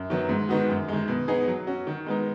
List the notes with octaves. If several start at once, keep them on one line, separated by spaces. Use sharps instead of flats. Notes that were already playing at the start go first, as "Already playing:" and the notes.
Already playing: F#2
D#3 F#3 B3
G#2
D#3 B3 D#4 F#4
F#2
D#3 G#3
B2
B3 D#4 G#4
F#3
C#4 F#4
D#3
G#3 B3 D#4